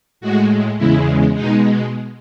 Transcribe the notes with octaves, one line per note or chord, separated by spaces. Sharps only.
A2 G#3 F#4
E2 C#3 G#3 E4
B2 G#3 D#4